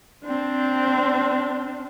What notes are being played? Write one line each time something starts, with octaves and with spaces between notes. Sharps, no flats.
C4 D4